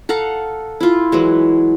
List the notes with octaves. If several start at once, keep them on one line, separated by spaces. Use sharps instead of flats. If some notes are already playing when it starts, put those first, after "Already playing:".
A4 F5 F#5 A#5
E4 F4
E3 F#3 G#3